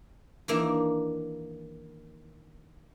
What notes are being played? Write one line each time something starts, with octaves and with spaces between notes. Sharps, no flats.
D#3 E3 A#3 D4